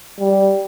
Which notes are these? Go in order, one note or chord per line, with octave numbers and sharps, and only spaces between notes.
G3